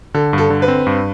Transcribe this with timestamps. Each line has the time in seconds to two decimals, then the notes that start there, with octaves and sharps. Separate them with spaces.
0.14 D3 A4
0.33 G2 A4
0.50 D3
0.62 B4
0.68 C4
0.87 G2